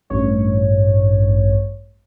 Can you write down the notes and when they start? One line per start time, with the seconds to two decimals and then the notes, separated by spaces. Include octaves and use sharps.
0.10 A1 G2 C#5